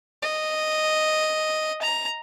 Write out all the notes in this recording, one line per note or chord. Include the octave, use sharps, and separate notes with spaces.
D#5
A#5